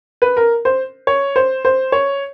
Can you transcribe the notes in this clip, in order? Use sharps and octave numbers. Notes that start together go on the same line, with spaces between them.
B4
A#4
C5
C#5
C5
C5
C#5